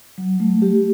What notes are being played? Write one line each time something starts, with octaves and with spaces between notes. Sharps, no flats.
F#3
A3
G4